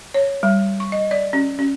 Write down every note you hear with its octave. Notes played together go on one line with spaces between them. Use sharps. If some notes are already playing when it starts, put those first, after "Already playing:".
C#5
G3
C#6
D#5
D5
C#4
C#4